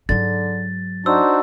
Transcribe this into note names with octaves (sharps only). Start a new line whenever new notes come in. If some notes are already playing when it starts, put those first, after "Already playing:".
G#2 D3 F#3 A6
D4 D#4 F#4 C5 E6